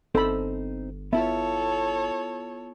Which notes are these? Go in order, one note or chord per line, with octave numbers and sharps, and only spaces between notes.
G1 C4 D#4 A4 C5 B5
B3 E4 F4 A4 C#5 E5